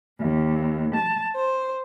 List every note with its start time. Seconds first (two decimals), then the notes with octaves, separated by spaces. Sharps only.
0.19 D#2
0.95 A5
1.35 C5